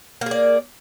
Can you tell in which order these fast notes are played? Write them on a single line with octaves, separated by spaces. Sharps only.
A#3 G#4 D5